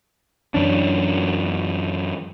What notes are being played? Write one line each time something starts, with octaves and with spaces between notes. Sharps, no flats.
F#2 E3 C#4 D4